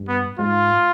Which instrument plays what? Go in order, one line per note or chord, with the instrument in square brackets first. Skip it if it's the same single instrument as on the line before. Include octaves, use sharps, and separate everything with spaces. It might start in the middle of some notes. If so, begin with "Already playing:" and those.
Already playing: [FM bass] G2
[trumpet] B3
[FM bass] G#2 [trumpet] F4